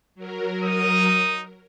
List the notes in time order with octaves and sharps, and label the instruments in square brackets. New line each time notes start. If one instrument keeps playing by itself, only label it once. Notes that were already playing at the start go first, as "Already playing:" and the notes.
[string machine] F#3 A#4
[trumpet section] D#4 D#6